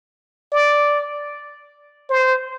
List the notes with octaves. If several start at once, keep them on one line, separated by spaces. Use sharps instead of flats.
D5
C5